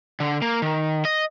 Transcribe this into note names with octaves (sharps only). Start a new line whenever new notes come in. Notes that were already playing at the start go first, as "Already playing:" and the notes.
D3
A#3
D#3
D#5